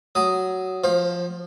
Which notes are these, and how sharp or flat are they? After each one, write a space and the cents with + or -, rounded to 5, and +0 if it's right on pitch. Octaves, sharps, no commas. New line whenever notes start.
F#3 +10 D#6 +0
F3 +0 C5 +30